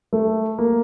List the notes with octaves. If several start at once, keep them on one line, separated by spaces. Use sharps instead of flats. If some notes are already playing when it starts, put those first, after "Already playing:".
A3
A#3